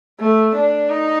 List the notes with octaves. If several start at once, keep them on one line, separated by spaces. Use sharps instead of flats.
A3
D4
D#4